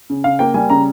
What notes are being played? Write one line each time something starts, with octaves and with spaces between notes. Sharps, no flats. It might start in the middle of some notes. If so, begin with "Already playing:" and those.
C#3
C#3 F5
A#3 G5
G3 G#5
C#3 A#5